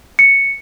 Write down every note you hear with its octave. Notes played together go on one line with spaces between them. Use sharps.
C#7